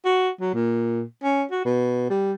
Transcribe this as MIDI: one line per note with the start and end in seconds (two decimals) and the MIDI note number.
0.05 0.29 66
0.41 0.53 54
0.54 1.03 46
1.23 1.43 61
1.51 1.64 66
1.65 2.07 47
2.10 2.33 55